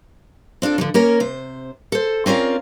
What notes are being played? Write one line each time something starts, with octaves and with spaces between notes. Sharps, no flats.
C4 D4 F4 A4
D3 F3 F#3
A#3 C#4 A#4
C3 C5
A4 C5
C4 C#4 F4 A#4 D5